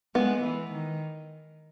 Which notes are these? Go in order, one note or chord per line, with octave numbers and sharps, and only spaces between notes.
G#3 B3
E3
D#3